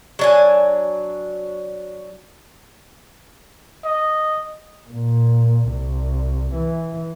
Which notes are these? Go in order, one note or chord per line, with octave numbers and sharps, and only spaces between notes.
F#3 D4 G#5
D#5
A#2
C2
E3